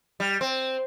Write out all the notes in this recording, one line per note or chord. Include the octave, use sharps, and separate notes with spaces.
G3
C4